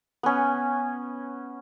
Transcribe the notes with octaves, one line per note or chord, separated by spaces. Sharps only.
B3 C#4